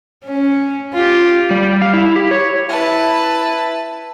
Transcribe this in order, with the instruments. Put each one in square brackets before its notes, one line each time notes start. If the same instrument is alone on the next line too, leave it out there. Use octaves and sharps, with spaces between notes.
[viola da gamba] C#4
F4 G4
[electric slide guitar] G3
F5
E4
G4
C#5
[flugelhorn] E4 [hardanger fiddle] B4 A5